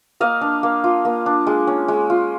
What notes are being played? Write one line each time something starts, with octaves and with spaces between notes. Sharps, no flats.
A#3 D#5 F5
D4
A#3
F4
A#3
D4
G#3
C#4
G#3
F4